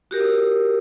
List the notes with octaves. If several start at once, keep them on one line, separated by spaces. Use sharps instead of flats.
F#4 G4 A#4